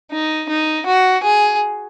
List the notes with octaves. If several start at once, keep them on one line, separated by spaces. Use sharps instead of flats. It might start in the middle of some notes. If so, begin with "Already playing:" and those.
D#4
D#4
F#4
G#4